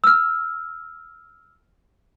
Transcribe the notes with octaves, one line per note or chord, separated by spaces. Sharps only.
E6 F6